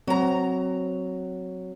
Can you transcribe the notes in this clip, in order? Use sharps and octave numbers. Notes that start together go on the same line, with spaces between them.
F#3 C4 A#5